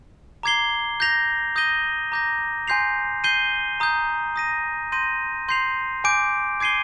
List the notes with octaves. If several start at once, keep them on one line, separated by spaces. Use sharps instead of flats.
A#5 D6 G#6 C7 G7
G6 A#6 F7
D#6 G6 A#6 D#7 G7
A#5 D6 G6 A#6
G#5 C6 G6 C7 F7
G6 C7 D#7 G7
A#5 D#6 G6
D#6 A#6 D#7
C6 G6 A#6 D#7
C6 G6 C7 F7
G#5 D6 G6 D7
D6 G#6 C7 D#7 G7